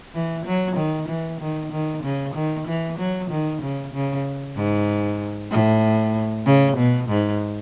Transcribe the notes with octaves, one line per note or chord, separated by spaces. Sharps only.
E3
F#3
D#3
E3
D#3
D#3
C#3
D#3
E3
F#3
D#3
C#3
C#3
G#2
A2
C#3
B2
G#2